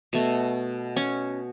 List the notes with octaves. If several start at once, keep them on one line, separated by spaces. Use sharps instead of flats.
B2 A3
C#4